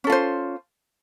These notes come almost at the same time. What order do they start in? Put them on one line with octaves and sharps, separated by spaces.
C#4 A4 F4 C5